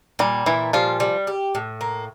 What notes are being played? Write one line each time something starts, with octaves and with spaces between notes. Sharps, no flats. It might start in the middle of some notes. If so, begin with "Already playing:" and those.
A#2 G3
A#2 E3 E4
F3 G3 F4
G3
G4
A2
A#3